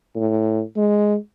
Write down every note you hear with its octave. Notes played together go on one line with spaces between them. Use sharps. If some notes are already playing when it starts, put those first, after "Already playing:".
A2
G#3